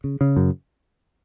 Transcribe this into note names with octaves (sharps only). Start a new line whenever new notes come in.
C#3
C#3
F#2